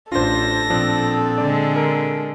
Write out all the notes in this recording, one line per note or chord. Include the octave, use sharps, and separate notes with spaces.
A1 D4 F4 A4 C5 A#6
A#2 F3 C4 D4
D3 G#3 D5
A#4